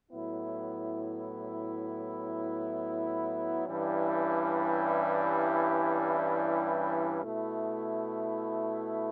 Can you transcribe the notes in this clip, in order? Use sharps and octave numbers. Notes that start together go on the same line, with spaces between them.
A2 F#3 B3 E4
G2 E3 G3 C#4 E4
B2 A3 E4